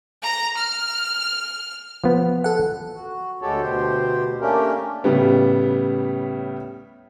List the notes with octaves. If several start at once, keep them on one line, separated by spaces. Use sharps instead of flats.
A#5
F6
F3 B3
A4 F#5
F#4
D2 G#3 F#4 G4 A4 C#5
D2 B2 G4 C5
A3 A#3 C#4 D4 G4 A#4
A2 C#3 G3 B3